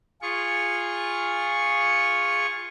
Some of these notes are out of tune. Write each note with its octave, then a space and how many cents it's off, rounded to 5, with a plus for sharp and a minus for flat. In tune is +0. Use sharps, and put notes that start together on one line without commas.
F4 +0 G#4 -15 C#6 +0